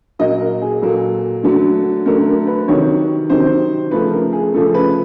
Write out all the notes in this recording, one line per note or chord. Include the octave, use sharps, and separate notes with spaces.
A#2 F#3 A#3 D#5
A#4
G#4
A#2 F#3 A#3 A4
D3 F#3 A3
D3 F#3 A3 A#4
A#4
B4
C3 D#3 F#3 C#5
C3 D#3 F#3 C5
C#3 F3 A3 B4
A#4
G#4
C#3 F3 A3 A4
B4